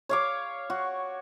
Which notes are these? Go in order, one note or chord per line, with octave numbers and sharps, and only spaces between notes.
C#5 F5 D6
F#4